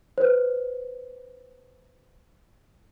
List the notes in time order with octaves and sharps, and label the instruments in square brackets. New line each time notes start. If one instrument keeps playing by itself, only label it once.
[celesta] B4 C5